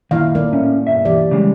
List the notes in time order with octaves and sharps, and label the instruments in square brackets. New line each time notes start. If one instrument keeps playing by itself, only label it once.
[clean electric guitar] F#2 A#2 D#3 [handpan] E4 F5
[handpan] A#3 D#4 D5
[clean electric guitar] A2 C#4
B1 G2 E5
[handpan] E3 G4 D5
[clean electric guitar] C#3 G3 G#3